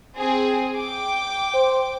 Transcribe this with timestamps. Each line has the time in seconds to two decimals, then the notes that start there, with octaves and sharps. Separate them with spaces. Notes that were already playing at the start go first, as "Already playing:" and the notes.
0.16 C4 G#4
0.78 G5 D6
1.54 C5